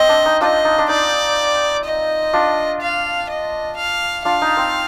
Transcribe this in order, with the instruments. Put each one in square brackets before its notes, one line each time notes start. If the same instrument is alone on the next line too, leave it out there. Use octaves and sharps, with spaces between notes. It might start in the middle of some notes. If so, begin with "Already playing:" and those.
Already playing: [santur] C4 [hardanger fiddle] D#5
[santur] D4
D#4
[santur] D4 F4 [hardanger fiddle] D#5
[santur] D#4
D4
[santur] D#4 [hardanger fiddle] D5
[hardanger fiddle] D#5
[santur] D4 F4
[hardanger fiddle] F5
D#5
F5
[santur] D4 F4 [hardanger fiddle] F5
[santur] D#4
C4